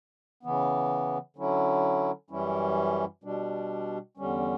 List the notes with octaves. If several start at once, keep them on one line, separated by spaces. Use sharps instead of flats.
C#3 E3 B3
D3 F#3 C#4 E4
F#2 E3 G3 C#4 E4
B2 G3 D4
E2 D3 G3 C#4